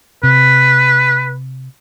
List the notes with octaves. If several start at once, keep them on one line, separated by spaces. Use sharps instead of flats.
C3 B4